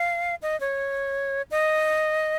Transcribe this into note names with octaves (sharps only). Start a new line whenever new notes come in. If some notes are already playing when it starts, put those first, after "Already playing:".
Already playing: F5
D#5
C#5
D#5